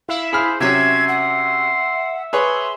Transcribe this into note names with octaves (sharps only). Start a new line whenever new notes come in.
E4 E5 F5
G#4 C5 B5 F6
C3 F#3 C#4 E5 C6 G#6
F#5
G#4 B4 C#5 C6